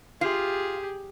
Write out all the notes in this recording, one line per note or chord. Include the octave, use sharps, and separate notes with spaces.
F4 G4 G#4